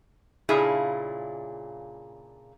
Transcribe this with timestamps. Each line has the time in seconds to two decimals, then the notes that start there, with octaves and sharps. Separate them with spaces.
0.49 A#2 C#3 D4 E4 G#4